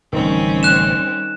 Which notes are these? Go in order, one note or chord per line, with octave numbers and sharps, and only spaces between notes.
D1 A1 D#3 G3 C4 C#4
F#6 E7